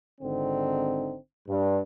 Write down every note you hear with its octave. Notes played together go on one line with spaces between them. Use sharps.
G#1 D3 C4 D#4
G2